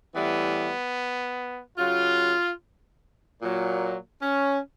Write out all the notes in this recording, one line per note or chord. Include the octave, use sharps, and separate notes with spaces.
A2 E3 G3 B3
C#3 F#3 F4
A#2 F#3
C#4